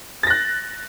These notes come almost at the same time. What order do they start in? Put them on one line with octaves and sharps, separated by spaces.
A6 A#6 F#6